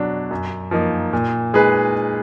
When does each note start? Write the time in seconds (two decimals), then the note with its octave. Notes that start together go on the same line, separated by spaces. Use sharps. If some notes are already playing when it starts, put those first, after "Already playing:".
Already playing: B2 F#3 D4
0.31 F#2
0.71 F3 A#3 D#4
1.13 A#2
1.54 G#3 D#4 G#4 B4